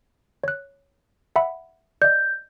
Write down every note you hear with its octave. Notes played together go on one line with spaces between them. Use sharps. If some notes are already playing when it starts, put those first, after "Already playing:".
C#5 F#6
E5 F#5 B5
D5 D#5 G6